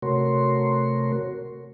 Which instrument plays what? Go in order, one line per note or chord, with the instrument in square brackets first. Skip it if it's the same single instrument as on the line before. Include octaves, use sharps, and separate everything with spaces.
[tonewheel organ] C3 A3 F#4 A#4 C#5 C6